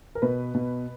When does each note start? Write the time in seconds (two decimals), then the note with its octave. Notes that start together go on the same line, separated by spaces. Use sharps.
0.15 A#4
0.22 B2 B4
0.54 B2